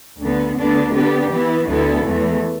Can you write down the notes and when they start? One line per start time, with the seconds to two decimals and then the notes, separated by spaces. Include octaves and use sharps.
0.20 D2 D3 B3
0.57 D2 D3 B3 D4
0.93 D3 B3 D4 G4
1.31 E3 B3 E4
1.67 D2 D3 B3 E4 A4
2.05 E2 E3 A3